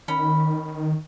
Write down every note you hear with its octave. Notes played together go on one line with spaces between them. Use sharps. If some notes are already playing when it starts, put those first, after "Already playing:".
D#3 C#4 B5